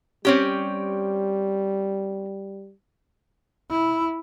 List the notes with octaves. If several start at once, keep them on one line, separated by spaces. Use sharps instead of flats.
G3 C4 C#4 G4
E4